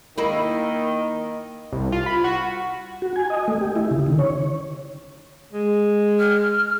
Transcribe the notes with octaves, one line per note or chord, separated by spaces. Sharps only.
D#3 A#3 E4 D#5
C2
F4
B5
F#4
F#4
G#5
D#5
A3
G4
E4
C#3
D#3
C#5
G#3
F6